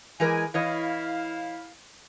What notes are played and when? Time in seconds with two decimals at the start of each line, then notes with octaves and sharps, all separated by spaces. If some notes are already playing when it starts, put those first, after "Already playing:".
0.20 E3 G#3 A#4 G#5
0.54 E3 E4 C#5 D#5 F5